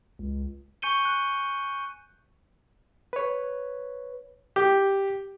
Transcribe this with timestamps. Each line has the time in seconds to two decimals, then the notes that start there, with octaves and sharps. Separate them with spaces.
0.19 C#2
0.82 G#5 C#6 G6 C#7 D#7 G7
1.05 F#6
3.13 B4 C#5
4.56 G4